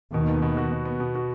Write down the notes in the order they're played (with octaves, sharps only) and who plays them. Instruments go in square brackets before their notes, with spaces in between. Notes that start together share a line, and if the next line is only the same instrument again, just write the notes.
[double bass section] D#2 D#3 [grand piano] B2
[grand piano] B3
B2
F#4
B2
B3
B2
F#4